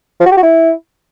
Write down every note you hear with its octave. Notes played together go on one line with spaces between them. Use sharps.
F3
F#4
G4
F#4
E4